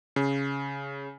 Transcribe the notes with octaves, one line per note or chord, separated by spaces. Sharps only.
C#3